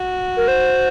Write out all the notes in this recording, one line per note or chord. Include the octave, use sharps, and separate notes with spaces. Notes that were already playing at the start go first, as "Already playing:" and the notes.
Already playing: F#4
A#4
C5